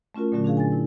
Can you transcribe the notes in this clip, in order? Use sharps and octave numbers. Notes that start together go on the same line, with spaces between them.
A3 C#4 F4 F#4 A#4
A#2 D3 F#3 A3 C#4 F#4
D4 F#4 G#4 F5
G#5 A6
E4